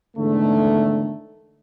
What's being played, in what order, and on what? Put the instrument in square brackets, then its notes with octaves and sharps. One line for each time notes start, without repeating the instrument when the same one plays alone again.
[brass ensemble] E2 G#2 D3 D#3 A3